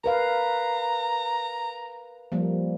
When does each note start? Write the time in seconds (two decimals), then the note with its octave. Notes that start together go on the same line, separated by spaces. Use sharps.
0.04 A#4 B4 F5 A#5
2.32 F3 G3 A#3